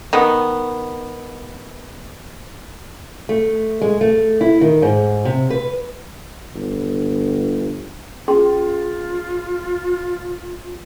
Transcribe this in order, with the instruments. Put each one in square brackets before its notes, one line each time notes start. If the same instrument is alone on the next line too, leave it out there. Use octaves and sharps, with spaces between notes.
[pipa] D#3 B3
[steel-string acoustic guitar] A3
G#3
A3
E4
D#3
G#2
C3
B4
[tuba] G1
[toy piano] C#4 G#4 C6 [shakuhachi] F4